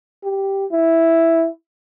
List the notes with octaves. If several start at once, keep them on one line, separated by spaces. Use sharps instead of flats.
G4
E4